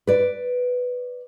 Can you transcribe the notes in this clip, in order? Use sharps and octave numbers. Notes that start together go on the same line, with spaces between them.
B4 D5